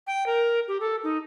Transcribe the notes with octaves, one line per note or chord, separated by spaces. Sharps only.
G5
A#4
G4
A4
D#4